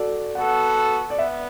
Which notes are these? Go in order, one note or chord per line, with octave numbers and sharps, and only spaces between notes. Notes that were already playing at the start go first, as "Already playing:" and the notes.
Already playing: F#4 A4 D5
B3 F#4 A4 F#5
D5
B3 E5